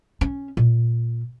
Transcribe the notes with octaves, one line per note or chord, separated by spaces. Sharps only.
C#4
A#2